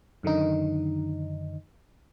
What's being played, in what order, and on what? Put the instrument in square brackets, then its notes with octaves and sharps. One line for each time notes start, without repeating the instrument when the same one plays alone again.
[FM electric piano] F#2 D3 D#3 D#4